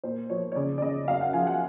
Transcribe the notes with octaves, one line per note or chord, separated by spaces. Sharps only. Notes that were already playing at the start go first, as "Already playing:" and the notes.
A#2 C5
F3 C#5
C#5
C#3 D5
D5
C#3 D#5
F#2 F5
F#5
F3 G#5
F#5